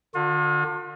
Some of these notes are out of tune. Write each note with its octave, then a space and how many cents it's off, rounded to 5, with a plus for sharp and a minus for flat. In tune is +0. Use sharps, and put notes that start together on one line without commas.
D3 +30 F4 +45